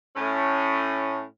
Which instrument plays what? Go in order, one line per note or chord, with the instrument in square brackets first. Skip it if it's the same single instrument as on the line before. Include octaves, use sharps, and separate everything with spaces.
[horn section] A2 C#4